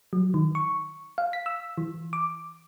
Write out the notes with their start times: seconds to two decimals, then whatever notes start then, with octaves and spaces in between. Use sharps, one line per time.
0.13 F#3
0.34 D#3
0.55 C#6
1.18 F5
1.33 B6
1.46 E6
1.78 E3
2.13 D6